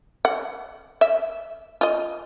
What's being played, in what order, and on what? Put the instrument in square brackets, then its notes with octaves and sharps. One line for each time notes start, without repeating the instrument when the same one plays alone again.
[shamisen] F#5
E5
F4 D#5